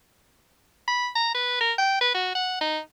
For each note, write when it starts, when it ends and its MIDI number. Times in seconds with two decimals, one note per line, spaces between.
0.88 1.09 83
1.15 1.30 82
1.34 1.59 71
1.61 1.73 70
1.78 1.98 79
2.01 2.10 71
2.15 2.31 66
2.35 2.56 78
2.61 2.79 63